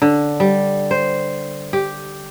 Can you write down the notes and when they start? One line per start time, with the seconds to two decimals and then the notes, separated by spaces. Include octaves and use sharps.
0.02 D3
0.40 G3
0.91 C5
1.73 G4